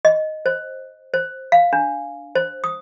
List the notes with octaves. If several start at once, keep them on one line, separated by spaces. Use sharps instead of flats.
D#5
C5
C5
F5
D4
C5
D#6